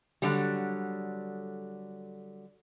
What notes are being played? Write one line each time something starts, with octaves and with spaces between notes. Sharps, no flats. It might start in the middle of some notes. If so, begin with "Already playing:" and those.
D3 F#3 G3